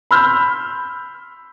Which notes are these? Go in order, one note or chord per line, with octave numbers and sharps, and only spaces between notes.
B5 C6 E6 F6 G6